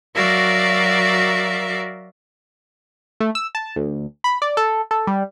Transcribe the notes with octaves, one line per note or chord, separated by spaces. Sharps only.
F#3 F#4 A#4 D5 E5 F5
A3
E6
A5
D2
B5
D5
A4
A4
G3